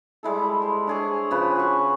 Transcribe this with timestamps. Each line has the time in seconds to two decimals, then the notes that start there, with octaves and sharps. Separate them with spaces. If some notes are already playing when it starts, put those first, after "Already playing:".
0.23 G3 G#3 E4 A4
0.62 C5
0.87 D4 G#4 C#5
1.31 C#3 F3 B4
1.55 F#4 C#6